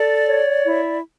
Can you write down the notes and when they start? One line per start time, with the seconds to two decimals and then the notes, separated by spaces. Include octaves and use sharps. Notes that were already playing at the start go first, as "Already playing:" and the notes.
Already playing: A4 D5
0.25 C#5
0.65 E4